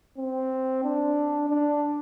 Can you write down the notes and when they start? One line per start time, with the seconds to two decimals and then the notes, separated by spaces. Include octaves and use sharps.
0.18 C4
0.84 D4
1.49 D4